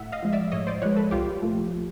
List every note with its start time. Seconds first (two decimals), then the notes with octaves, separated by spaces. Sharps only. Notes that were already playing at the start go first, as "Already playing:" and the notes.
Already playing: A2 E5 F#5
0.12 D#5 F5
0.22 F3 G#3
0.33 D5 E5
0.52 A2 C#5 D#5
0.67 C5 D5
0.82 F3 G#3 B4 C#5
0.96 A4 B4
1.11 C2 F4 G4
1.42 A#2 F3 A3